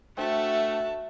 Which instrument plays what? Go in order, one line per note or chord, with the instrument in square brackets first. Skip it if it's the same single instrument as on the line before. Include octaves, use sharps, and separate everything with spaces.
[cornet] A3 [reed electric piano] D4 C5 G5 [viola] F#4 A5 [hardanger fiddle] E5